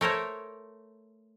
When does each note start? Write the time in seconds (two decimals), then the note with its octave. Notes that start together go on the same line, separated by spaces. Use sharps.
0.01 A3 A#4 C5 C#5